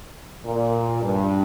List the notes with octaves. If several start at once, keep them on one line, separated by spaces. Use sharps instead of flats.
A#2
G2